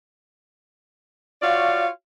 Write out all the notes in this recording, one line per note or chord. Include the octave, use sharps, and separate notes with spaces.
F4 F#4 C#5 D5 F5